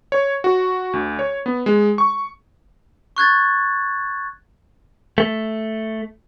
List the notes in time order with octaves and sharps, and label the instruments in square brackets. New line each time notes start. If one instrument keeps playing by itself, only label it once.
[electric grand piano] C#5
F#4
D2
C#5
B3
G#3
C#6
[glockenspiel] C#6 F#6 G#6 A6
[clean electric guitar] A3